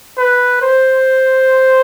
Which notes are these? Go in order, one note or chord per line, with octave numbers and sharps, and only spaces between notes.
B4
C5